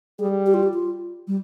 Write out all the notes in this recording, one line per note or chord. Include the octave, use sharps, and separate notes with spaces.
G3 G#4
G4
F4
G4
F4
G3